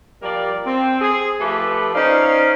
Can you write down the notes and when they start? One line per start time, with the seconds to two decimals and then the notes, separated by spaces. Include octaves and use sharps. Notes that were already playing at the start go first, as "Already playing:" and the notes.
0.22 F3 G3 A#3 A#4 D5
0.65 C4
1.01 G#4
1.41 F3 A3 G4 A4 B4
1.95 C#4 D#4 C5 D5 F5